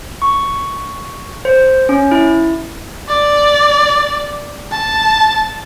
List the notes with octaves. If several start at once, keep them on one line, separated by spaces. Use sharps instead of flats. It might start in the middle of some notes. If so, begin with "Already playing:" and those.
C#6
C5
C#4
E4
D5
A5